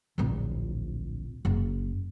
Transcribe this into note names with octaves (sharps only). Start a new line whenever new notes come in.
D1 A#1
F#1